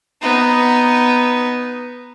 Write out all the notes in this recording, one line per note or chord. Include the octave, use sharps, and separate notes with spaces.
B3 D#4